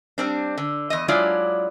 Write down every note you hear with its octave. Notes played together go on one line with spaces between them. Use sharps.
G3 C4 D4
D3
E2 D#5
F#3 G#3 D4 E4 F4 D5